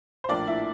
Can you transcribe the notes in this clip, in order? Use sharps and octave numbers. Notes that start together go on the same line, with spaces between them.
C5
A#1 A2 F3 A#3 D4 D5
E4 E5